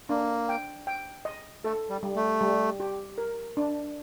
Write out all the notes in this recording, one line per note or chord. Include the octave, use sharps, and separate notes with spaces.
A#3 D4
G5
G5
D#5
A3 A4
G3
G3
A3
G3
G4
A#4
D4